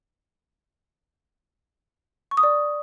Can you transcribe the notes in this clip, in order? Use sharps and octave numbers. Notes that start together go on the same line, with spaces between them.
C#6
D#6
D5